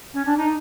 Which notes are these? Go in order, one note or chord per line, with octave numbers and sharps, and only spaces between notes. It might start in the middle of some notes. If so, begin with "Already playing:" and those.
C#4
D4
D#4